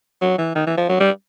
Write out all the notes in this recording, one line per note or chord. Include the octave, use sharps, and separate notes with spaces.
F#3
E3
D#3
E3
F3
F#3
G3